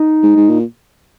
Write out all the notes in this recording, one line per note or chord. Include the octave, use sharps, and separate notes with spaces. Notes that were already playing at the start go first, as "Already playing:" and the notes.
Already playing: D#4
G#2
G#2
A#2